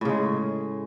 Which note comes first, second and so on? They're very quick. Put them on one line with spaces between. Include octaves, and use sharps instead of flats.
A2 C#3 G#3